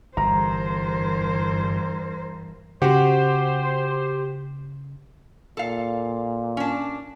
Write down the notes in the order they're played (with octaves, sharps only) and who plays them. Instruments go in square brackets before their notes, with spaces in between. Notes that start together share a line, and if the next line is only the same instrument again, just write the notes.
[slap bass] G1 [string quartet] E2 G2 [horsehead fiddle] A#4 C5 [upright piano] A#5
[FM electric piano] C#3 [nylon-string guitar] F#4 F#5 [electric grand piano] G4 [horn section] C5
[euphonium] A#2 [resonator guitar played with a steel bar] A4 F5
[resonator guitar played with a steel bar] C#4 D4